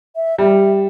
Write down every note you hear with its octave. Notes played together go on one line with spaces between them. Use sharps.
E5
G3 E5